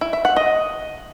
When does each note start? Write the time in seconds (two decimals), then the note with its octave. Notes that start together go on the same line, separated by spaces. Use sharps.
0.01 E4
0.13 E5
0.25 F#5
0.36 D#5